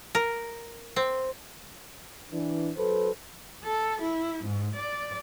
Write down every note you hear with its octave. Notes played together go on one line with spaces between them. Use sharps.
A#4
C4
E3 D4
F#3 A4 B4 C5
A4
E4
G#2
D5